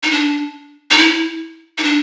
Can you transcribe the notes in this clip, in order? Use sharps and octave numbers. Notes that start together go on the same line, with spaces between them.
D#4
D4
D#4
E4
D#4
D4